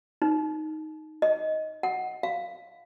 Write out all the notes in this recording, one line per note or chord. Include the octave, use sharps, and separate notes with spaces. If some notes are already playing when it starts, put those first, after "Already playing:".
D#4
D#5
F#5
F5